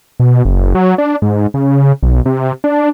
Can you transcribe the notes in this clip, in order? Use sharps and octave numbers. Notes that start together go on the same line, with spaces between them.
B2
F#1
F#3
D4
G#2
C#3
B1
C3
D4